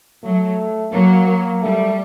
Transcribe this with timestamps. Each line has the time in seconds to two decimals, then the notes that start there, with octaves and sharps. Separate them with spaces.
0.23 F#3 A3
0.92 F#3 A#3
1.28 A#3
1.62 G3 A3